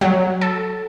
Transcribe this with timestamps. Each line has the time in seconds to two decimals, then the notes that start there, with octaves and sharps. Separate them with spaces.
0.01 F#3
0.41 A4